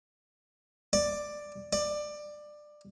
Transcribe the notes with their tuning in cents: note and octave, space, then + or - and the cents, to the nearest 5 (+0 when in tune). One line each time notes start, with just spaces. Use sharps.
D5 +10
D5 +20